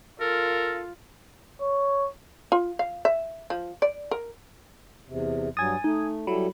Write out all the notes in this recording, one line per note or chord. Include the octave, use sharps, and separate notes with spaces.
F4 A4 A#4
C#5
F4
F5
E5
F3
D5
A#4
E2 C3
G2 F#3 G#5 D#6 A6
A3 D#4
F#3 G3 E4 A4 B5